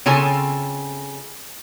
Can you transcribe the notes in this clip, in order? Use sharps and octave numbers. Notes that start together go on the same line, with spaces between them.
C#3 C4 F4 A4 G#5